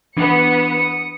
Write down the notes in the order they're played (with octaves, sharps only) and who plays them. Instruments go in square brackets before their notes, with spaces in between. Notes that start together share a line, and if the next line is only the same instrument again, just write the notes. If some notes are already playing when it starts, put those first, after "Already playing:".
[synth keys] E3 D4 [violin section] B3 [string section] D#6 C#7